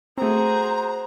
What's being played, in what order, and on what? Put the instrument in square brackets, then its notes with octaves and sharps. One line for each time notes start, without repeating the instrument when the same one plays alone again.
[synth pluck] A3 C4 [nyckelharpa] F#4 G#4 [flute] C5 [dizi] A#5